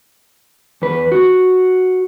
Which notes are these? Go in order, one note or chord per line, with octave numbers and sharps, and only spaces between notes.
E2 B4
F#4